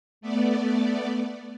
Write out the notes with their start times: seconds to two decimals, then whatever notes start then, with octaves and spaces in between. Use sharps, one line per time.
0.21 A3 B3 D5